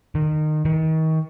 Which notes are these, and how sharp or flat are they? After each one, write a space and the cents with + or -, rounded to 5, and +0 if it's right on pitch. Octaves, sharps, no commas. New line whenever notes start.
D#3 -25
D#3 +35